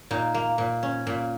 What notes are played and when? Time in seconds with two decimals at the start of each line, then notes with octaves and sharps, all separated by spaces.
0.11 A#2 D#4
0.34 A#3
0.58 A#2
0.83 C#4
1.07 A#2